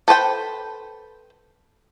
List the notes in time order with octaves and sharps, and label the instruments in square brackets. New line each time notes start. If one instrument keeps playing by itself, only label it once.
[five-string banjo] A4 B4 C5 G5